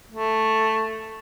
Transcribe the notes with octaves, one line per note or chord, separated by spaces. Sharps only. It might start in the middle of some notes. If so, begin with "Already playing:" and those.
A3